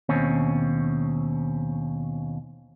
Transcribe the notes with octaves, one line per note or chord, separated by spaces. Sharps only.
D#2 B2 C4 C#4